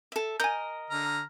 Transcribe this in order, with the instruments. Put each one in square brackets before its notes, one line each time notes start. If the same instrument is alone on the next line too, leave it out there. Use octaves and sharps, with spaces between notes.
[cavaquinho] A4 E5
[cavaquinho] A#4 D#5 [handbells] G#5 G6
[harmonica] D3 A#5 F6